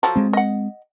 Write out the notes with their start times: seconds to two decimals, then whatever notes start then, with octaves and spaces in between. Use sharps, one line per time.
0.03 F3 F#3 A4
0.16 G#3 C4
0.33 D#5 F#5